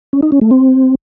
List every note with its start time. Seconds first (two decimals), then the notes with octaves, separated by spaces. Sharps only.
0.13 C#4
0.23 D#4
0.32 C#4
0.41 A3
0.51 C4